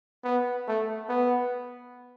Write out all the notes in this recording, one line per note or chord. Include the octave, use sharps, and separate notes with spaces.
B3
A3
B3